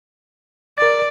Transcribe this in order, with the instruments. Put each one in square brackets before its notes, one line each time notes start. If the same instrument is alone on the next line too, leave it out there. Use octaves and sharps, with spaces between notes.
[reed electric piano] A#4 A6 [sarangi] D5